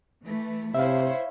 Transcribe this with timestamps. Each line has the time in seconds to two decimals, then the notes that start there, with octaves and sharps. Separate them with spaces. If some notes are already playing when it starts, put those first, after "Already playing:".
0.22 E3 A3
0.75 C3 E4 C5 C#5 E5 F5